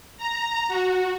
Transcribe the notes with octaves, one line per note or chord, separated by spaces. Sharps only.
A#5
F#4